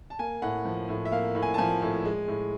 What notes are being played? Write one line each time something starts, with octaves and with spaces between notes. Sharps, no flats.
A5
A#3 G#5
A2 F#5
F3
A2
E5
A#3 F5
A2
G#5
A5
F3 G#5
A2
G#3
A2